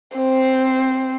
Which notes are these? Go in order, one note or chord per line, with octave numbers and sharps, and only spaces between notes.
C4 C5